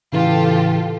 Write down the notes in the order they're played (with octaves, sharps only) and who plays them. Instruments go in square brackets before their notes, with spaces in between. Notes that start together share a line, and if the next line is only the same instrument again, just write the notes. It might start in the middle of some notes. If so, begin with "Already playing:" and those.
[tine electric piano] A2 C#3 E3 [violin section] F4 G4 A4